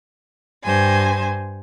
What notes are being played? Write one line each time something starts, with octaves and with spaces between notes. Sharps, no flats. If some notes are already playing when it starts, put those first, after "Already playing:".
G2 C5 G#5